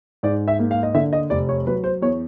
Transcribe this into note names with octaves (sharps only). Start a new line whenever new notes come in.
G#2 D5
E5
A#3
F5
D#5
D3 E5
D#5
F1 D5
C#5
F#3 B4
C5
E2 C#5